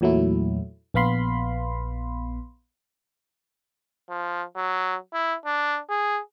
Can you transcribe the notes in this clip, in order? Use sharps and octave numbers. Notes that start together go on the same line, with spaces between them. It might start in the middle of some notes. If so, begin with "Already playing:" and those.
E2 A#2 F#3 A3 E4
A#1 B3 F5 B5 C6
F3
F#3
E4
D4
G#4